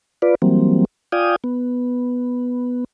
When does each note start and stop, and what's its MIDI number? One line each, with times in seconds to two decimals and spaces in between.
0.22 0.35 65
0.22 0.35 71
0.22 0.35 74
0.42 0.85 52
0.42 0.85 54
0.42 0.85 55
0.42 0.85 58
0.42 0.85 60
1.12 1.36 65
1.12 1.36 74
1.12 1.36 77
1.12 1.36 79
1.12 1.36 80
1.12 1.36 87
1.44 2.84 59